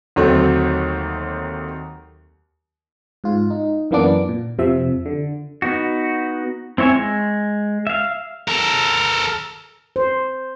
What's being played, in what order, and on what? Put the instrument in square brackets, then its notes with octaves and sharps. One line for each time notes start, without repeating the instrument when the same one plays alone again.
[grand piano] D#2 D3 F#3 A3 C4
[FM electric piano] G#2 F4
D#4
F#2 E3 A#3 B3 D4 D6
A#2
F2 C3 F3 E5
D3
[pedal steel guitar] B3 D#4 F#4
C4 E4 C#5 E5 G#5
G#3
E5 F5
[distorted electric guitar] A4 A#4
[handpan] C5